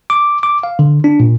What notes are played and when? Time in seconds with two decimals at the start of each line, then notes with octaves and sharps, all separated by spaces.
0.10 D6
0.43 D6
0.63 F5
0.79 D3
1.04 D4
1.20 A#2